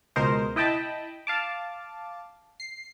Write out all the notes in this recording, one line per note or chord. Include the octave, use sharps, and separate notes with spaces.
C#2 B2 A#4 C5 D#5
E4 D#5 G5 A5 B5
F5 A5 D6
C7